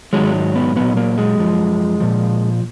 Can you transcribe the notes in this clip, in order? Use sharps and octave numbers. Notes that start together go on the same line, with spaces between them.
G#2 D#3 F#3 G#3
B3
A#2 F#3 B3
A#3
G#3
F#2 F3
A#2 F3